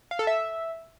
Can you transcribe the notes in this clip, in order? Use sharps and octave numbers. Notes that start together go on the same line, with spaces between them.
F5
A4
E5